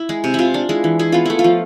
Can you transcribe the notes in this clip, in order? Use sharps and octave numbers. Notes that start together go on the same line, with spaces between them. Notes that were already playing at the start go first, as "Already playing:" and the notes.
Already playing: E4
G#3 G#4
C3
C3 E4 F4
D4
G#3 E4
E3
E4 G#4
B3 F4
A3 E4
F4
F3